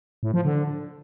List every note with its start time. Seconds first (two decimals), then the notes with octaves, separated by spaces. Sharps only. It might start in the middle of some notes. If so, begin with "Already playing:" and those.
0.23 A2
0.34 F3
0.45 D3